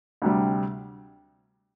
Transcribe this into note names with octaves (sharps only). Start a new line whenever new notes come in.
D2 C3 G3